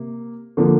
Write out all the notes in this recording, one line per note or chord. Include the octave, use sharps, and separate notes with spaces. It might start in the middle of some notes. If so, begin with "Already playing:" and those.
Already playing: C3 A#3
D3 F3 A#3